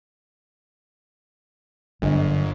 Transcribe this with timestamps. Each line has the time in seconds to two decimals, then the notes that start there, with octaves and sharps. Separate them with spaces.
2.02 G1 F#2 D3 G3 D4 D#5